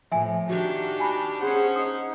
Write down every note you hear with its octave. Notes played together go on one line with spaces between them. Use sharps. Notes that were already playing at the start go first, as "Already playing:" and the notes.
A2 F3 E5 G#5
D#3 D4 F#4 G4
G#5 A5 B5
C#4 G#4 C5 F#5
D#4 D#6